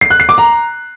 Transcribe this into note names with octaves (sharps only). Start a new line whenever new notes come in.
C7
F#6
C7
D6
A#5